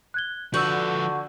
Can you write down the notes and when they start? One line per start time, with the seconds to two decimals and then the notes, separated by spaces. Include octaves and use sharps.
0.14 F#6 G#6 G7
0.54 D3 F3 F#4 B4 E6 G6